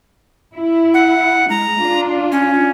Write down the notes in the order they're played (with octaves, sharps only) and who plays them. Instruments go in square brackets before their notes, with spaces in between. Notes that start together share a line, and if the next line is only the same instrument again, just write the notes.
[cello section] E4
[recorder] F#5
[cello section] G#3 [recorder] A#5
[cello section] D4 F4
[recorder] C#4